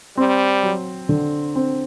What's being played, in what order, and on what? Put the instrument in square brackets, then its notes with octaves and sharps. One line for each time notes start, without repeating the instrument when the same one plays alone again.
[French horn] G3 [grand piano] C4
[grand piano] F#3
D3
C4